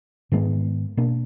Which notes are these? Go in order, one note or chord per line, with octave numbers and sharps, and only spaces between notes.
G#2 D#3 G#3 B3
B2 A#3 D4